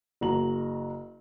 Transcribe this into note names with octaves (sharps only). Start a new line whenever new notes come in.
F#1 F#4 A#5 F#7